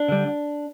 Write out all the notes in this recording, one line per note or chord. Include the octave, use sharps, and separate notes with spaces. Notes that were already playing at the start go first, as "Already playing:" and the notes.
Already playing: D4
D3 G3